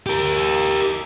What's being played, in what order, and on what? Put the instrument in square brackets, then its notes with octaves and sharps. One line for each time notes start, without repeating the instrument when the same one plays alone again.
[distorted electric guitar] G4 A#4